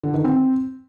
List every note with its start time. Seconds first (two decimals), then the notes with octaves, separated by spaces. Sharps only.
0.03 D3
0.14 D#3
0.24 C4